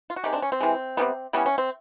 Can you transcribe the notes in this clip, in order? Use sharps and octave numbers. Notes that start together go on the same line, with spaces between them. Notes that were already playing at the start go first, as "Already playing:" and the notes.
F4
F#4
C3 D#3 G#3 G4
C4 D4
C#4
C4
C3 E3 G#3
C3 D#3 G3 B3
E3 G3 B3 C#4
C#4
C4